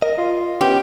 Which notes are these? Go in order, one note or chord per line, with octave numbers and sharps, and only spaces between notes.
A#4 D#5
F4
B3 C#4 G4